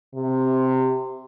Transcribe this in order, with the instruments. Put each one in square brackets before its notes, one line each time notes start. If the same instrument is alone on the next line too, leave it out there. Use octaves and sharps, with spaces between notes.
[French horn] C3